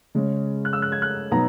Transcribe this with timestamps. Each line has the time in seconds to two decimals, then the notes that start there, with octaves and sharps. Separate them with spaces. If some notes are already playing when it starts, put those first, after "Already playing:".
0.15 C#3 G#3 C#4
0.65 F#6
0.73 E6
0.82 F#6
0.92 G#6
1.02 F#6
1.31 B2 F#3 B3 D#4 A#5